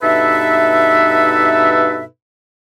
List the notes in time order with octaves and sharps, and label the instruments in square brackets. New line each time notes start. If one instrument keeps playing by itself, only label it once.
[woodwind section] G2 B2 D#4 A4 B4 E5